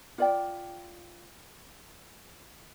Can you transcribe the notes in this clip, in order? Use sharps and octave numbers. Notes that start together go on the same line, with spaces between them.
F4 D5 G5